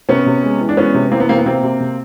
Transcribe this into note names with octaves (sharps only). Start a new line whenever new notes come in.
C3 B3 C#4
C3
G#3
E3
D4
G#3 B3 C#4
C3
E3 A#3 C4
B3
C3 A#3 C4
B3
C3 A#3 C4
C3
C3